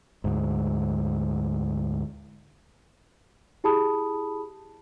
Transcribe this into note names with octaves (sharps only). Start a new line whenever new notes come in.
D2 G#2
E4 G4 G#4 A5 B5 D#6